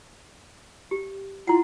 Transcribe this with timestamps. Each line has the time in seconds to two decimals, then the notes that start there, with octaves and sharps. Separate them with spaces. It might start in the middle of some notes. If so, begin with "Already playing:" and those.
0.91 G4
1.47 E4 F4 F#5